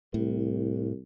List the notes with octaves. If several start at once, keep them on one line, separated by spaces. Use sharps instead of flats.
C2 A2